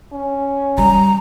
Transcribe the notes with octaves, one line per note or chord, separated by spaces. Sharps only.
C#4
G3 A#5